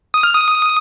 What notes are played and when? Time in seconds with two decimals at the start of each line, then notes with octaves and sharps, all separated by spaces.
0.14 D#6
0.23 F6
0.34 D#6